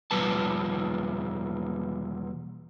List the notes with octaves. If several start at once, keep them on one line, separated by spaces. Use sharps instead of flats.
E2 B2 F3 G3 B4 A5